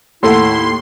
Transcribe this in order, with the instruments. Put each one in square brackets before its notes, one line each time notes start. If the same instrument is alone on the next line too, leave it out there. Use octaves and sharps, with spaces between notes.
[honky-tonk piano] D#2 A2 [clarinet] E4 [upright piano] A4 F#5 [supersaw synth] C6